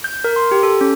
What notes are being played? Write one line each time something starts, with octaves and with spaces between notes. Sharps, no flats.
G6
A#4
C6
G4
A4
C#4